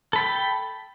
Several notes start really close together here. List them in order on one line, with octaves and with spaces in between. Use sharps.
A4 B5 G5